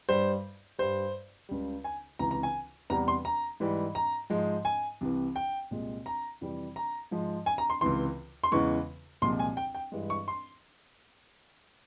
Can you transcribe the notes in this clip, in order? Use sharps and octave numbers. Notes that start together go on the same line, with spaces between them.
G2 G3 C5
G2 G3 C5
C#2 C#3 G3
G#5
C#2 C3 E3 A#5
A#5
G#5
E2 C3 G3 A#5
C6
A#5
G#2 E3 G3
A#5
G#2 F3 G#3
G#5
C2 C3 E3
G5
C2 A#2 G#3
A#5
F2 C3 E3 G3
A#5
G#2 F3 G#3
G#5
A#5
C6
C#2 C3 E3 C6
C6
E2 C#3 E3 G#3 C#6
C2 A#2 F3 G#3 C6
G#5
G5
G5
G2 E3 G#3
C#6
C6